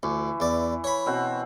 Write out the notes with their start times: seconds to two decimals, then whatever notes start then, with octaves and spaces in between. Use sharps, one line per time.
0.03 D2 E3 C#6
0.40 E2 D5
0.84 C#5 B5
1.06 B2 C4 F#5